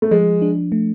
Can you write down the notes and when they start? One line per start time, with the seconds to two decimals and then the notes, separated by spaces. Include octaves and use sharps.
0.02 A3
0.11 F3 G#3
0.42 D4
0.72 A3